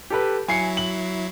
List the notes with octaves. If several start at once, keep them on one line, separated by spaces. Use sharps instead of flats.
G4 A4 B4
F#3 E4 G#5 C7 C#7
F#7